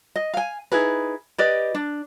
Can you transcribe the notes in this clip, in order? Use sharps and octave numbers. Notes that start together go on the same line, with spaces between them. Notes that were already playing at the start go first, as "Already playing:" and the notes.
D#5
F5 G#5
D#4 E4 G#4 B4
G4 B4 D5 D#5
D4